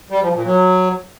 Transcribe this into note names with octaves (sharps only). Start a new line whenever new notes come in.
G3
F3
A#2
F#3